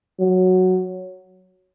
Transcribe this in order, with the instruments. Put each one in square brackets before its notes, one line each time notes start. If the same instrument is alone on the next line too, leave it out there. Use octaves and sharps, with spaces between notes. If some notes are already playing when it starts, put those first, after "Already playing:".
[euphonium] F#3